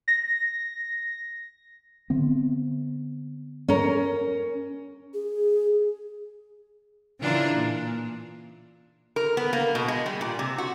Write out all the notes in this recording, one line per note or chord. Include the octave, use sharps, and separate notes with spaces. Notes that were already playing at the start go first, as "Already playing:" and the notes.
A#6
D3 B3 C4
C#4 A#4
G#4
C#3 E3 D4 F4 A#4
A#2
A#4
B3
A#3
B2
G#3
G3
A#2
C3
F#4